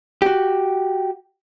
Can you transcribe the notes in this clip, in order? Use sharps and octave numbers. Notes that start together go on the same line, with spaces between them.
F#4 G4